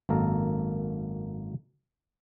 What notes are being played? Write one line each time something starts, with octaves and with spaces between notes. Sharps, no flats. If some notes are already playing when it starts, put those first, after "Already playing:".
G#1 F#2 A#3 A4 A#4